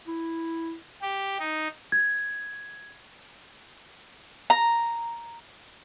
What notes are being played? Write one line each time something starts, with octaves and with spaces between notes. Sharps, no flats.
E4
G4
D#4
G#6
A#5